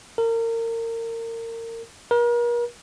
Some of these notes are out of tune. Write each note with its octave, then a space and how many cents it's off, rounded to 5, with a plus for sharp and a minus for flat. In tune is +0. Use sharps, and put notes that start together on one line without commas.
A#4 -30
A#4 +40